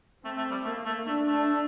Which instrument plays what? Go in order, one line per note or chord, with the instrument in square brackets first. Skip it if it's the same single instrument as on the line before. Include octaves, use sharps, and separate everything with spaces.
[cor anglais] A3 [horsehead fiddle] C4
[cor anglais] A3
G3
[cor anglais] A3 [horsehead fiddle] A#3
[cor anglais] A3
[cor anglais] A3 [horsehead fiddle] D4
[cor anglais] A3